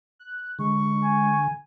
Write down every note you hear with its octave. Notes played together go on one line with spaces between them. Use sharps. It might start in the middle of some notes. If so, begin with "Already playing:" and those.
F#6
D3 G#3 C#6
G#5